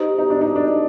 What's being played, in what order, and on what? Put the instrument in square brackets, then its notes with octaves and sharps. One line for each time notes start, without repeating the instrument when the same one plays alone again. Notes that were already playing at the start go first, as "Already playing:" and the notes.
Already playing: [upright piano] D#4 [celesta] G4 C5 D#5
[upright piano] D#4
D4
D#4
D4